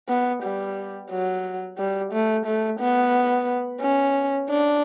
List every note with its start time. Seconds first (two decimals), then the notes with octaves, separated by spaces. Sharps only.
0.09 B3
0.43 G3
1.11 F#3
1.78 G3
2.13 A3
2.46 A3
2.80 B3
3.81 C#4
4.49 D4